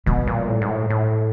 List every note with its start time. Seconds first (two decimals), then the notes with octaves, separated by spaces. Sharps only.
0.06 B2 G3
0.27 A#2
0.48 A2
0.62 G#2
0.70 A2
0.90 A2